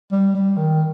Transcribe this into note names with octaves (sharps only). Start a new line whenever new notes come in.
G3
G3
D#3